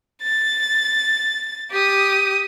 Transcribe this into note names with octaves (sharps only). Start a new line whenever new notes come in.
A6
G4 D#6